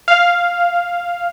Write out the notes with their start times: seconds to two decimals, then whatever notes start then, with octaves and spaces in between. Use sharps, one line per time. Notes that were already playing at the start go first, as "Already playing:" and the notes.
0.08 F5